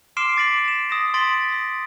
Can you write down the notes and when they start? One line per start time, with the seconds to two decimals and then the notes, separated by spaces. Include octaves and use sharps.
0.17 C6 D6 F6 C7 D7 E7
0.37 D6 A6 B6 D7 F#7
0.68 E7
0.90 D#6 A#6 E7
1.14 C6 A6 B6 D7 F#7
1.52 D#6 A#6